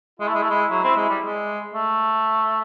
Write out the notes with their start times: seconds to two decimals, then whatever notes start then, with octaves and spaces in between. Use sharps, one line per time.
0.20 G#3 E4
0.28 A3
0.35 G#3
0.42 A3
0.50 G#3
0.71 F#3
0.84 C4
0.96 G#3
1.09 G3
1.23 G#3
1.74 A3